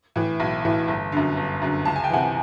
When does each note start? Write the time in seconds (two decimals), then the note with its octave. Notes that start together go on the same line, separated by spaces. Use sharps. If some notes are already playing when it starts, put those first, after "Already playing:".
0.16 A2 E3
0.40 B1
0.65 A2 E3
0.88 G1
1.12 F#2 D3
1.37 G1
1.62 F#2 D3
1.85 C#2 A5
1.96 G#5
2.04 G5
2.10 C3 E3 F#5 G#5